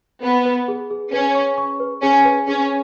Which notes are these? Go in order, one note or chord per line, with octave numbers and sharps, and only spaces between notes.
B3 B4
B4
G#4
G#4
C#4 B4
C#6
C#6
B4
C#4 G#4
B4
C#4 G#4